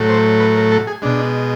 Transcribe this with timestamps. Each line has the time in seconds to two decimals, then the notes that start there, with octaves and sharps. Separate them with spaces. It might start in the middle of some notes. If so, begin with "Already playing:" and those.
Already playing: A2 F#3 A3
0.09 C5
0.40 B4
0.56 A#4
0.72 A4
0.87 G#4
1.02 B2 G#3 D4